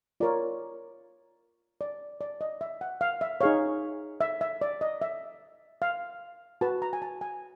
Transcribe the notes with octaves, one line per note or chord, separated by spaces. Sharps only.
F4 A#4 C#5 D5
D5
D5
D#5
E5
F#5
F5
E5
D#4 G#4 C#5 F5
E5
E5
D5
D#5
E5
F5
F#4 B4 A5
A#5
G#5
A5
G#5